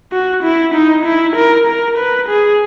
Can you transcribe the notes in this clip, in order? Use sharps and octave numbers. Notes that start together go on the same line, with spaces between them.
F#4
E4
D#4
E4
A#4
A#4
B4
G#4